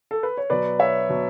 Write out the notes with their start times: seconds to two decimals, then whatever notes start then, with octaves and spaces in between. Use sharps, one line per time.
0.11 A4
0.23 B4
0.37 C#5
0.50 B2 F#3 B4 D5
0.79 C#5 E5
1.09 B2 F#3